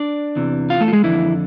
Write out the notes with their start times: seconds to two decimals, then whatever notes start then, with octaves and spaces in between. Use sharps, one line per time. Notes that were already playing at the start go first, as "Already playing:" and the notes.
Already playing: D4 D5
0.36 E2 C3 E3
0.70 F4 F5
0.80 A3 A4
0.88 F4
0.93 G#3 G#4
1.04 F2 D3 E3 E4